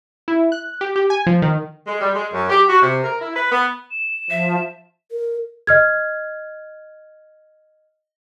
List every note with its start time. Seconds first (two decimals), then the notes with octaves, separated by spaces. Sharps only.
0.28 E4
0.52 F#6
0.81 G4
0.96 G4
1.10 G#5
1.27 F3
1.42 D#3
1.87 G#3
2.01 G3
2.14 G#3
2.33 F#2
2.50 G4
2.69 F#4
2.82 C3
3.03 A#4
3.22 E4
3.36 B4
3.52 B3
3.91 E7
4.30 F3 E5
5.11 A#4
5.67 D#5 F6 G#6